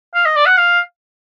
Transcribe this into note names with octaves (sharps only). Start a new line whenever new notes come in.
F5
D#5
D5
F#5
F5